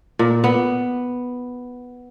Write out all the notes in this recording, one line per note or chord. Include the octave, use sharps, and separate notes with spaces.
A#2
B3